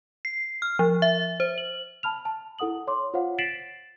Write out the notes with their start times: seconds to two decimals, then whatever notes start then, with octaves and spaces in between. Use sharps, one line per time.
0.25 C7
0.62 F6
0.79 F3
1.02 E5
1.40 C5
1.58 F#7
2.03 A5 B5 F6 F7
2.25 A5
2.59 E4 A4 F#5 D#6 F#7
2.87 C#5 C6 D6
3.14 F4 C5 C#5 F5 F#5
3.38 A6 B6 C7 D7 E7 F#7